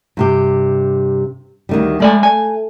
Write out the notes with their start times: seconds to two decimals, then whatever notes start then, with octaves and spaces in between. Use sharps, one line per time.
0.17 G2 C3 G4
1.69 D2 D#3 G3
2.00 G#3 A3 D5 G#5
2.23 G#5